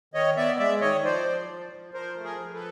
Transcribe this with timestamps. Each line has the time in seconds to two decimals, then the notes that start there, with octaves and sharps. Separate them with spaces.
0.14 D#3 C#5 D#5
0.37 B3 D5 E5
0.59 G#3 D5 E5
0.81 D#3 C#5 D#5
1.04 F3 C5 D5
1.27 F3
1.49 F3
1.72 F3
1.93 F3 A#4 C5
2.17 A3
2.24 G#4 A#4
2.39 F3
2.54 A4 B4